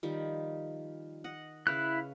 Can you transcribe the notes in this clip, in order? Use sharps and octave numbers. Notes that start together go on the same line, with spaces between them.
D#3 F3 G3
D#5 F#5
C#3 E4 B4 F5 F#6